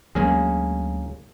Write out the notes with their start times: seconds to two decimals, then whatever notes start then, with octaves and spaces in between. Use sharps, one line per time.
0.15 D2 F#3 G#3 A#3 C#4 G#4